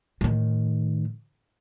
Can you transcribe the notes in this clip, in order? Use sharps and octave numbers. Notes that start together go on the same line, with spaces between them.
A2 D#3